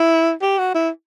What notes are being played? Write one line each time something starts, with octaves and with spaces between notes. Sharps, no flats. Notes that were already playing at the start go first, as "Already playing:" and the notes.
Already playing: E4
G4
F#4
E4